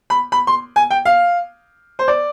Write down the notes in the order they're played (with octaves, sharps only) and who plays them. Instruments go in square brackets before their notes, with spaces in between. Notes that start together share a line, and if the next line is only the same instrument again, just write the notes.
[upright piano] B5
B5
C6
G#5
G5
F5
C5
D5